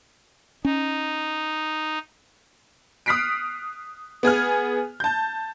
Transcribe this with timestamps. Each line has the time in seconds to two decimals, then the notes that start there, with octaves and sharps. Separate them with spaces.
0.65 C#4 D#4
3.06 D#6 F6 F#6 B6 C7 D7
4.23 B3 G#4 G#5 F6
5.00 A5 G6